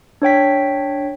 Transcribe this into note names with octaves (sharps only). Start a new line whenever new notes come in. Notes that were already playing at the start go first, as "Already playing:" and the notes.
D4 C#5 G5 B6